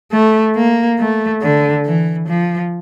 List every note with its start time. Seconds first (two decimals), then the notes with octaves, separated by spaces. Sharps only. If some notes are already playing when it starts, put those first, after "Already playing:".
0.12 A3
0.56 A#3
0.99 A3
1.42 D3
1.86 E3
2.28 F3